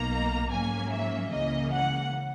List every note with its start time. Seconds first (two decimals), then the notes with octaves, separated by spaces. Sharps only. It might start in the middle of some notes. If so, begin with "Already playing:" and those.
Already playing: B1 B2 A#3 D#4 A#5
0.52 G#2 F#3 A#3 C#4 G#5
0.92 E5
1.32 C#2 C#3 E3 A#3 C#4 D#5
1.72 F#5